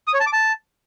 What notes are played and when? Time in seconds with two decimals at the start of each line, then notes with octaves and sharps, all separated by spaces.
0.08 D#6
0.14 C#5
0.20 A5
0.26 D6
0.33 A5